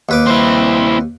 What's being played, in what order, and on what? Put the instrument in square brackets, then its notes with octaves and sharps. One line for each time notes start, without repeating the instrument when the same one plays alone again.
[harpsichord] D#2 B4 D6
[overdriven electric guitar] C4 E4